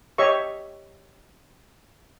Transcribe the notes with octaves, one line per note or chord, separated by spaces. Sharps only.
G4 C#5 D#5 E5 C#6